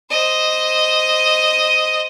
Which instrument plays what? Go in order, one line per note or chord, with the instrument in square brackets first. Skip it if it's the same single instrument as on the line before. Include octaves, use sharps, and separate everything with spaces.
[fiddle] C5 D#5